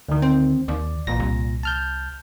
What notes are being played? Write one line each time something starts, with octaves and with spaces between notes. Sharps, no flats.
D2 D#3
C4
D#2 D5
A1 A#2 A#6
C2
A5 F6 G6